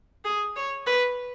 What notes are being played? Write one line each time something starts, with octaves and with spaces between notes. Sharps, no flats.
G#4
C#5
B4